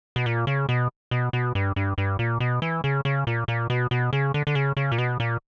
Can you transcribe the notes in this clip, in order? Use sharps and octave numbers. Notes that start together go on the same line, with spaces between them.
B2
A#2
C#3
B2
B2
B2
G2
G2
G2
A#2
B2
E3
C#3
C#3
A#2
A#2
B2
B2
C#3
D3
D3
C#3
C#3
A#2
B2
A#2